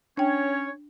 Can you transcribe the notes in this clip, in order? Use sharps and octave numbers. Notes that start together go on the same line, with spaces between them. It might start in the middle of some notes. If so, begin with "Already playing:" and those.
C#4 D4 C#5 G5